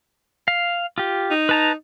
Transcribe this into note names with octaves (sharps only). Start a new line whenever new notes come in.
F5
F4 G4
D#4
B4 A5 A#5